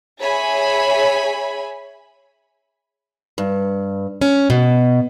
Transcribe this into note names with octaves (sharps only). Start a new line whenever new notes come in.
G#4 C#5 E5 G#5 B5
G2
C#4
B2